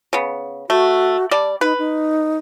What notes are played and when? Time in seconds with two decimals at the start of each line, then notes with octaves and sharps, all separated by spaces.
0.13 C#3 B3
0.70 A3 F#4
1.31 G3 D5 A5
1.61 D#4 B4
1.79 D#4